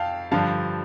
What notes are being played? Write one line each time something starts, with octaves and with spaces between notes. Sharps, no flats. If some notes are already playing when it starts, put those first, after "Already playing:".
Already playing: F2 F5 G5 A5
G2 D3 F3 F5 A5